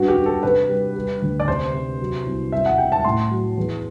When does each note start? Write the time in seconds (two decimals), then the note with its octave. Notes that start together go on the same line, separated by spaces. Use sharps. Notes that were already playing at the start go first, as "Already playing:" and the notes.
Already playing: G2 F#4
0.08 G4
0.17 G2
0.26 A4
0.43 C3 B4
0.69 G3
0.96 G3
1.22 D2
1.40 D5
1.48 C3 C5
1.74 C3
2.01 F#3
2.26 C2
2.52 G3 E5
2.66 F#5
2.78 G3 G5
2.92 A5
3.04 A2 C6
3.31 F#3
3.57 E2